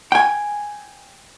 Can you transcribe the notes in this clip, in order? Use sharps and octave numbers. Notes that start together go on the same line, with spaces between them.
G5 G#5